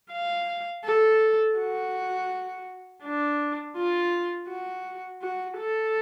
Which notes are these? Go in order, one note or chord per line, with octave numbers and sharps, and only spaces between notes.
F5
A4
F#4
D4
F4
F#4
F#4
A4